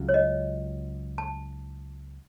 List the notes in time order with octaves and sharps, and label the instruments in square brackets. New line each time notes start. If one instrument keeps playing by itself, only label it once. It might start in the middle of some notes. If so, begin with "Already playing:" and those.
Already playing: [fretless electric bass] C#2 C#3 F#3
[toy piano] C#5
D#5
A5